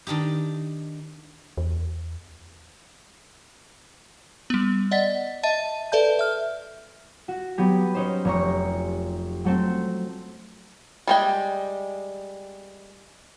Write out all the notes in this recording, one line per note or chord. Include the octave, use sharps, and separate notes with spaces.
D#3 D4 D#4 G4
E2
G3 B3
D5 D#5 F#5 A6 B6
D#5 E5 A5 A6 D#7
A4 B4 D5 E5 A5 G6
E5 F6
F#4
F#3 B3 G4
C#4 D#4 C5
F1 A#5 C#6
F#3 A3 C4
G3 G#3 G5